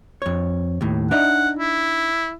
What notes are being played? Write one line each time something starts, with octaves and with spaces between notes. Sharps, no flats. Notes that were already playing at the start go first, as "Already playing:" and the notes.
F2 C#5
D#2 A2
D4 D#4 E5 F#5
E4